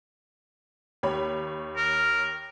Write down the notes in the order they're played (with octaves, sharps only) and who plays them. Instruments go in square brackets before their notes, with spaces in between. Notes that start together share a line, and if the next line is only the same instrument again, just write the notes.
[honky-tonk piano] D#2 C#5 B5
[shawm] A#4